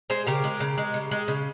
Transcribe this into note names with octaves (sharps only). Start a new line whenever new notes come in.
G#3 G#4 C5
C#3 G4 A#4
G#3
C#3
G#3
C#3
G#3
C#3